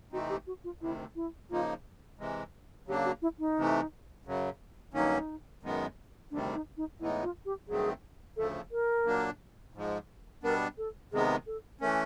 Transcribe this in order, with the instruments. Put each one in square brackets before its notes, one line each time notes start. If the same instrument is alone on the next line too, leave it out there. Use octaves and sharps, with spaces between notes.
[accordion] C3 E3 A3 C4 D#4 [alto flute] F#4
[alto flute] G4
F#4
F4
[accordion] D2 C3 D#3 [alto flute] E4
[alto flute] E4
[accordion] C#3 F3 A#3 D#4 [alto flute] F4
[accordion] C3 E3 G#3
[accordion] C#3 F#3 A#3 D4 [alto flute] G4
[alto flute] F#4
E4
D#4
[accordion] C3 E3 A3
F#2 C#3 F#3
[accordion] G2 D#3 F#3 A#3 C#4 [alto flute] D#4
[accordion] F#2 D#3 G#3 B3
[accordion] D2 C3 D#3 G3 [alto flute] D4
[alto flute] D#4
D#4
[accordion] A2 E3 G#3 B3 D#4 [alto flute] E4
[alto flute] F4
G4
[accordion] G2 D#3 F#3 A3 C4 [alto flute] G#4
[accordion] D2 C#3 F3 A3 [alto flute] A4
[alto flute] A#4
[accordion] A#2 F#3 A#3 D4
G#2 F3 G#3
[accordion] B2 G3 B3 D4 [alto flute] A#4
[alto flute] A4
[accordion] C3 D#3 G#3 B3 [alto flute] G#4
[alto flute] A4
[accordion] E3 A3 C#4 [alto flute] A#4